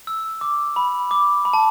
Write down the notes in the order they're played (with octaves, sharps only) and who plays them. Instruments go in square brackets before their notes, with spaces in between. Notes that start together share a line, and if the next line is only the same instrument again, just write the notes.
[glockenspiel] E6
D6
B5
D6
B5
A5